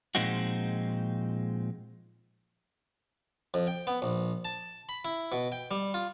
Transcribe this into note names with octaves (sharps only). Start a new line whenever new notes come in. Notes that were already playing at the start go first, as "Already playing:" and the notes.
A#2 F3 G#3 C4 D#4 F#4
F2
G5
B3
A#1
A5
B5
E4
B2
G5
G3
F4